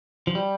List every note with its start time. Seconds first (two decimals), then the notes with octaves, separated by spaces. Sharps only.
0.27 F3
0.35 G3